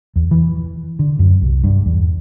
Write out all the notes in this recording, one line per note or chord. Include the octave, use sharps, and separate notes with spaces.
E2
E3
D3
F#2
C2
G2
E2